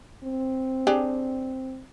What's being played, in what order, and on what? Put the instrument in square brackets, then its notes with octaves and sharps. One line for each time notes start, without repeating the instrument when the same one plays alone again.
[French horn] C4
[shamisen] D4 G4 G#4